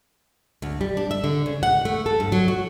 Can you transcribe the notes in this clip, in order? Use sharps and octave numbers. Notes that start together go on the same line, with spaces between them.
D2
G3
D4
E5
D3
C#3
F#5
A3
A4
G2
F#3
F#4